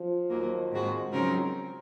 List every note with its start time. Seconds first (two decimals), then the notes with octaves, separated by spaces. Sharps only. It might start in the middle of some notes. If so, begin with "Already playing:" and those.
Already playing: F3
0.30 D#2 D#3 F#3 A#3
0.71 G#2 D#3 G#3 C4 F#4
1.12 C#3 F#3 C4 D#4 A#4